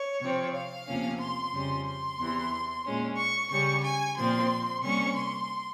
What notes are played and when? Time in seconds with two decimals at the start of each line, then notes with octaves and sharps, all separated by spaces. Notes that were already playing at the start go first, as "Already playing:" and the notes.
Already playing: C#5
0.21 C3 F3 C4
0.55 F5
0.87 E2 C3 F3 A#3 C#4
1.21 C6
1.54 F2 C#3 G3 C#4
1.87 C6
2.20 E2 C3 E3
2.85 A#2 G#3 C#4
3.18 C#6
3.51 C#3 G3 C#4 C#6
3.84 G#5
4.17 A#2 F3 C4 C6
4.83 C3 G3 A#3 C#4 C#6
5.16 C6